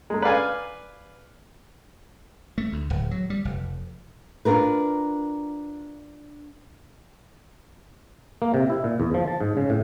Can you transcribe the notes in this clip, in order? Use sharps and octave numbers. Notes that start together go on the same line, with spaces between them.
G#3 A3
B4 D5 F5 G#5
A3
D2
D1
F#3
G3
F1
D4 F4 A#4 B4
A#3
C3
E4
A#2
E2
F3
A5
G#2
C#3
A2